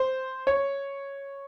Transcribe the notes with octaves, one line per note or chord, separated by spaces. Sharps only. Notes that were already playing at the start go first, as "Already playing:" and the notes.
Already playing: C5
C#5